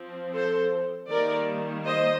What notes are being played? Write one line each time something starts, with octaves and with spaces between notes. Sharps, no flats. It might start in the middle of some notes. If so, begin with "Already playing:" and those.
Already playing: F3 C4
A4 C5
D#3 G3 A#3 A#4 D5
C5 D#5